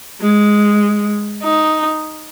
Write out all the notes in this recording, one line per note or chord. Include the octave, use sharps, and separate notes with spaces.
G#3
D#4